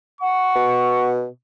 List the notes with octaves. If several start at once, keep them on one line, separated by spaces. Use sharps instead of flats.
F#5 C#6
B2